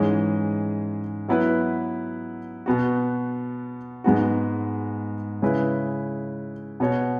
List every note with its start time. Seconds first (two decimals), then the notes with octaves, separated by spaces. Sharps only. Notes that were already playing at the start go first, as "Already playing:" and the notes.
Already playing: G#2 E3 G#3 C#4 G#4
1.28 F#3 B3 E4 B4
2.66 B2 B3 F#4
4.04 G#2 G#3 B3 F#4
5.42 C#3 G#3 E4 B4
6.80 B2 B3 F#4 C#5